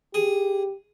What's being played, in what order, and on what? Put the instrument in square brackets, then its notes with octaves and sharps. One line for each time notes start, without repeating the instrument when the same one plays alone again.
[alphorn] G4 [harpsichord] G#4